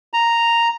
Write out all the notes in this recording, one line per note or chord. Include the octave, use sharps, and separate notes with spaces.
A#5